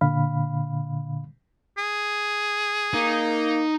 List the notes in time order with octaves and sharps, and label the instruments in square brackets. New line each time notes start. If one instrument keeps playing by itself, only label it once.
[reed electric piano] A#2 D3 F5 B5
[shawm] G#4
[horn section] A#3 [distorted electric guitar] D#4